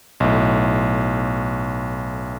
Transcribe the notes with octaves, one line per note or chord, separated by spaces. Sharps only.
B1 A2